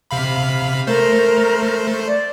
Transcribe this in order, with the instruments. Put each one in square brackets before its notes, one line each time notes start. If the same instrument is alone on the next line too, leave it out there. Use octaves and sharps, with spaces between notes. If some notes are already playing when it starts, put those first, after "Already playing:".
[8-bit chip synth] C3 F5 B5
[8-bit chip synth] A3 C5 [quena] A#4
[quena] D5